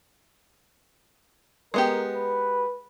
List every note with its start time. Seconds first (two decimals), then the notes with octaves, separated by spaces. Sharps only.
1.74 G#3 B3 G4 A#4
2.16 B4